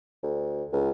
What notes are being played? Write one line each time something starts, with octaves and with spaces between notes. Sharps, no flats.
D2
C#2